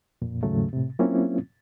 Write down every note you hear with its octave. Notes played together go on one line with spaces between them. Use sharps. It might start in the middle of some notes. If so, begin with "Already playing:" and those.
F2 A#2
D#2 G#2 C#3 F#3 A3
A2 C3
F#3 A#3 C4 C#4 E4 F4